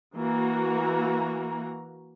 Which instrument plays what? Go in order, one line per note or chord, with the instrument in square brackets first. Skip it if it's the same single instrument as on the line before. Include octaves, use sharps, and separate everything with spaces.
[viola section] E3 A#3 F#4 A#5